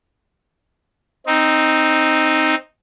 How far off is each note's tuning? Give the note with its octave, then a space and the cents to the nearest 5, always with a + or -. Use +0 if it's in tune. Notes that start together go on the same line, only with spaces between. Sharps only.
C4 +5 D#4 +0